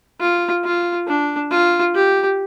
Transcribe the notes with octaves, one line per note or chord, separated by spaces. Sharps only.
F4
F4
D4
F4
G4